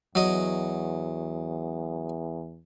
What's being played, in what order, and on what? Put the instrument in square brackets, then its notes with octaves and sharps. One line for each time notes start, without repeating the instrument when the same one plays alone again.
[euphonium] E2 [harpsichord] F#3 D#5